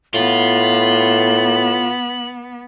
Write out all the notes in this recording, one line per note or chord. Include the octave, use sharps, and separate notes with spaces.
A2 B3 F4 F#7